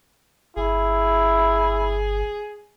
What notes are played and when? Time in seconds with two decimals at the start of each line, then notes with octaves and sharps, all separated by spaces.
0.57 G1 E4 G#4